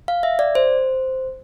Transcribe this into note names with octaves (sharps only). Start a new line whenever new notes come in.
F5
E5
D5
C5